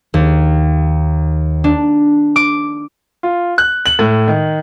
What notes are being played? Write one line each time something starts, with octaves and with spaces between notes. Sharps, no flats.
D#2
D4
D6
F4
F#6
F#7
A2
D#3